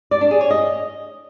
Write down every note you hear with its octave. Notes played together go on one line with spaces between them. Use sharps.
D5
D4
G#4
C#5
D#5